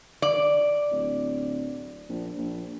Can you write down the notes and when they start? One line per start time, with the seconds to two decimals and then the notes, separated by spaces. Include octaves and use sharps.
0.22 D5
0.91 D1
2.09 A#1
2.38 A#1